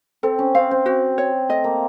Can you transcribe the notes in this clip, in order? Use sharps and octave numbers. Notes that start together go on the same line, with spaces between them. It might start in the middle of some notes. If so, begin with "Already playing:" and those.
C4 A4
C#4
C4 F5
C4
C4 F#4
C#5
A3 D#5
A#3